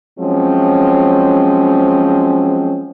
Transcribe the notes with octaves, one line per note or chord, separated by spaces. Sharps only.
F3 F#3 G#3 C4 C#4